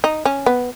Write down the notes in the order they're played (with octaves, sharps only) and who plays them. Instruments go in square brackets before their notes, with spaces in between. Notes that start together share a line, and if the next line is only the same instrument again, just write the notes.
[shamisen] D#4
C#4
B3